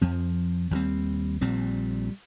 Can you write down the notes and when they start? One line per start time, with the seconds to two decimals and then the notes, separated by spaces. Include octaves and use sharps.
0.01 F2 F3 C4
0.71 D#2 D#3 G3 C4
1.41 A#1 A#2 G3 C4